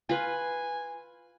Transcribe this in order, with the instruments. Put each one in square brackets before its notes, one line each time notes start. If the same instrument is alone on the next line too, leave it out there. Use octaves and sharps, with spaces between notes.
[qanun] F4 B4 [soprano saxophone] G#5